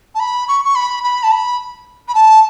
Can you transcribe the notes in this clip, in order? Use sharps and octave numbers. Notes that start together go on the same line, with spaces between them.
A5
B5
C#6
C#6
B5
B5
A5
B5
B5
A5